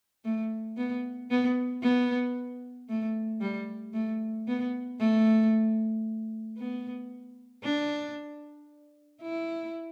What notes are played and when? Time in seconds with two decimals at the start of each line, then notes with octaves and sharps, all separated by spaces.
0.25 A3
0.77 B3
1.31 B3
1.83 B3
2.89 A3
3.41 G3
3.94 A3
4.48 B3
5.00 A3
6.58 B3
7.64 D4
9.22 E4